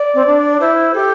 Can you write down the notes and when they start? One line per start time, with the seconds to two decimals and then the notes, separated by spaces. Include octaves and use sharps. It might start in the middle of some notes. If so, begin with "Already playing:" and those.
Already playing: D5
0.14 C4
0.26 D4
0.60 E4 C5
0.94 G4 A4